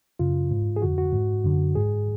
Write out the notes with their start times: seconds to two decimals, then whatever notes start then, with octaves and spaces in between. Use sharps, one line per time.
0.19 F#2 C#3 F4
0.51 G#2
0.76 G#4
0.82 F2 D3 F#4
0.98 F#4
1.13 G#2
1.44 F#2 D3
1.75 G#2 G#4